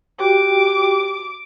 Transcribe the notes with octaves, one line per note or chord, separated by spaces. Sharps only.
F#4 G4 G5 D6